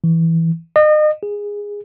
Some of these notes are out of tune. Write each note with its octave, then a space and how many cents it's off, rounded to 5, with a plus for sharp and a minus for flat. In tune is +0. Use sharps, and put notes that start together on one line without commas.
E3 -5
D#5 -35
G#4 -15